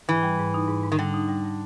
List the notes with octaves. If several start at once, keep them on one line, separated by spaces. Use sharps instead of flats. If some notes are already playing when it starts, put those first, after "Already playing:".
G#2 E3
G3
G#2
D#4
G#2
G#2
D#3
D3 G3
D#4
G3
G3